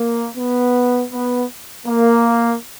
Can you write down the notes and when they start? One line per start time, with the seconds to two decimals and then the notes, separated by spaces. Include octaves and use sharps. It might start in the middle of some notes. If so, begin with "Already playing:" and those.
Already playing: A#3
0.37 B3
1.12 B3
1.87 A#3